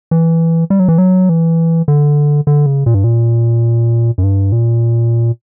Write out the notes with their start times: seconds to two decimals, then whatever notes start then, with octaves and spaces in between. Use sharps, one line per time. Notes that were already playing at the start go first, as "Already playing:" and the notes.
0.11 E3
0.70 G3
0.79 F#3
0.88 E3
0.98 F#3
1.29 E3
1.88 D3
2.47 D3
2.66 C#3
2.86 A#2
2.94 G2
3.04 A#2
4.18 F#2
4.23 G2
4.52 A#2